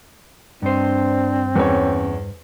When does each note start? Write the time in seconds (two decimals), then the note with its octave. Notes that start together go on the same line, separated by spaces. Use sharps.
0.62 G2 C4 D4 C5
1.55 E2 C#4 C#5